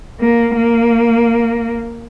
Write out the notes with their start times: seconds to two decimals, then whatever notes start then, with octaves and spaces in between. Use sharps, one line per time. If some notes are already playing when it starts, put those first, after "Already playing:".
0.20 A#3
0.57 A#3